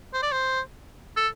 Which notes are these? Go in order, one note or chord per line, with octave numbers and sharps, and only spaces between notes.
C5
D5
C5
A4